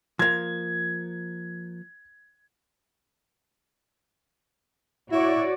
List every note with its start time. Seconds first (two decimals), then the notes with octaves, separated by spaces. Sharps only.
0.19 F3 A#3 G#6
5.12 E4 F#4 C#5 D5